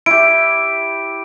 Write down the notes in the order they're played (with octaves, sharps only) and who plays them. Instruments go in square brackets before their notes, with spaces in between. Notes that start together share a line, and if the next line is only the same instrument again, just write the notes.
[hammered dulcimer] E4 G4 [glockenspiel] D7